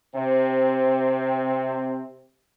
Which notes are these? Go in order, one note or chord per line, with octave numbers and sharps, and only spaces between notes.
C3 C4